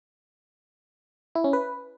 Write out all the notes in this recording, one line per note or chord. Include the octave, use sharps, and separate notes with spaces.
E4
C#4
B4